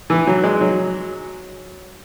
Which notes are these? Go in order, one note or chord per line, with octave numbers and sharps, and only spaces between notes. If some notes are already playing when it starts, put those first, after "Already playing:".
E3
F#3
G#3
F#3